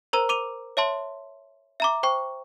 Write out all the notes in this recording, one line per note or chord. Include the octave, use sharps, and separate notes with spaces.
A#4 C5 A#5 E6 D#7
D6 D#7 F7
C#5 E5 A5 C6
E5 A#5 D6
C5 G5 C#6